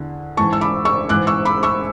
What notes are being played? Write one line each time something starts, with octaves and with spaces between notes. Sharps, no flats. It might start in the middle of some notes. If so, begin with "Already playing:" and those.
Already playing: E2 D3
G#2 E3 A5 C#6
E6
B5 D6
C#6 E6
G#2 E3 D6 F#6
C#6 E6
B5 D6
C#6 E6